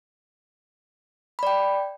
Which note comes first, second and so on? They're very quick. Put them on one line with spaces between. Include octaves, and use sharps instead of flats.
B5 D5 G5